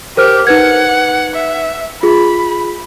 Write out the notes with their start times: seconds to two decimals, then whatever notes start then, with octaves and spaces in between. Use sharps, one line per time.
0.17 G4 A#4 C5 F6
0.47 D#4 B4 F#5 G#6
1.34 E5
2.03 F4 G#4 B5